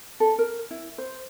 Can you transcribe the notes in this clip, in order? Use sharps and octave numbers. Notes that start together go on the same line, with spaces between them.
A4
A#4
E4
C5